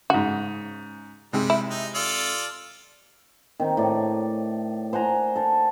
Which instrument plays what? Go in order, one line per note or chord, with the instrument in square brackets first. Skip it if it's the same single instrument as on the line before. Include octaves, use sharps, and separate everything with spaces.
[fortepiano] G#2 C#3 [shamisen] F#4
[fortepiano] C3 G#3 [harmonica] G3
[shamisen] E4
[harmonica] D#4
F4 A4 D5
[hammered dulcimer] D#3 C4
A2 D5 C#6
C5 F#5 G#5 A#5
A4 C5